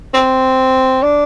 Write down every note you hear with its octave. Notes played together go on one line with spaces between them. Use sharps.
C4
D4